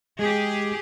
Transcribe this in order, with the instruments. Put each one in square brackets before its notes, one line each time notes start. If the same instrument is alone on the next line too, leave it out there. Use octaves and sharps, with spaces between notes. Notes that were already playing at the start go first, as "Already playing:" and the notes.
[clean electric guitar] G#3 [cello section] G4 G#4